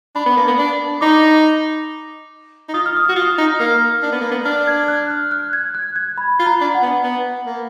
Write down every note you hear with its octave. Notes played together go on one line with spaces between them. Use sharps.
D4 B5
B3
A#3
B3
D4
D#4 D6
D#4
F4 D#6
F6
D#6
F#4 F6
F4
D#6
D#4
A#3 F6
D4
B3
A#3
B3
D4 F6
G#6
F#6
F6
F#6
G#6
F#6
G#6
B5
F4
A#5
D4
F#5
B3
B3
A#3